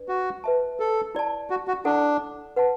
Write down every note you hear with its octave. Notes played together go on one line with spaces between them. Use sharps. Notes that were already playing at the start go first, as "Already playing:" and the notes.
Already playing: D4 B4 D5
F#4
B4 E5 A5
A4
E4 D5 A5
F#4
F#4
D4 E4 A4 F#5
B4 F#5 A5